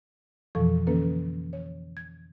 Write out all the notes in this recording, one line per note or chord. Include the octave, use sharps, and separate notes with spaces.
F2 B2 E3 F3 A4 C#6
D3 E3 A#3 C#4 A4 B4
C#5
G#6